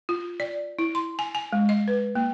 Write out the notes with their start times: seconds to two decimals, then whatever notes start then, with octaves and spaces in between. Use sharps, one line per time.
0.09 F4
0.40 D5
0.79 E4
0.95 C6
1.19 G#5
1.35 G#5
1.53 G#3
1.69 D#5
1.88 B4
2.15 A#3